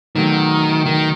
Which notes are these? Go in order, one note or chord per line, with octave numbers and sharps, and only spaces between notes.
E2 B2 D#3 F#3 A3
D#3